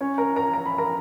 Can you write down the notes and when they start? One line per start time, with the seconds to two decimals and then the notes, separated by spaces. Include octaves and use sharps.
0.01 C#4 C#5
0.18 A#4 A#5
0.36 A#4 A#5
0.54 A#5
0.66 B5
0.78 A#4 A#5